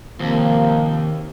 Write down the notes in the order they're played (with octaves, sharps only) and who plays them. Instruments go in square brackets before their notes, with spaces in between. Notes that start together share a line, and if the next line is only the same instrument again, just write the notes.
[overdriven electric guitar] D#2 [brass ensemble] C3 F3 A#3